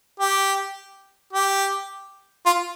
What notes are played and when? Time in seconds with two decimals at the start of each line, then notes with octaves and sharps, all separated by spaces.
0.20 G4
1.33 G4
2.46 F4